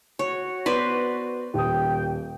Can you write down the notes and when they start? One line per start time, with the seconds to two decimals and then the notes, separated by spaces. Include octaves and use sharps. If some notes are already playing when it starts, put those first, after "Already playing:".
0.19 F#4 C#5
0.66 B3 B4 C5 D5
1.54 D#1 G5 D#6